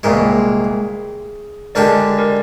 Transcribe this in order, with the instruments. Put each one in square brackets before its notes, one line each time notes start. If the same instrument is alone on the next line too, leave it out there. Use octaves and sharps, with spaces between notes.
[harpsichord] C2 A#2 G#3 [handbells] G#4
[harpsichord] D3 G#3 D4 G4 [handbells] A#4 D5
[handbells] A#4 D5